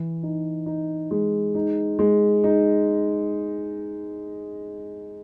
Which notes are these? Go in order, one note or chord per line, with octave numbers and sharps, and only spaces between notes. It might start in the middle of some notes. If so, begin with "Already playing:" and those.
Already playing: E3
D#4
D#4
G#3
D#4
G#3
D#4